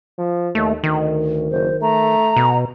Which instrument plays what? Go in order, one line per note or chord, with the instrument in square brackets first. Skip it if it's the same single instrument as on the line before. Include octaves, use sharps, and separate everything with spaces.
[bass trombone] F3
[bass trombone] D#2 [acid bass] A3
[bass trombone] D2 [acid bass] D#3
[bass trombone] F#1 [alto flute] C5
[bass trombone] A3 [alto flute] A#5
[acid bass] B2